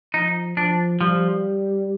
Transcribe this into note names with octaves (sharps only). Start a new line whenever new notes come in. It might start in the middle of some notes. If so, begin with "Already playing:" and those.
F3 D#4
F3 D4
F3 G3